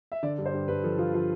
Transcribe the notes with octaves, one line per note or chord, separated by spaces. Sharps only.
E5
D3 D5
G2
C5
G2
G2 B4
F3 A4
F3 F4
F3 F4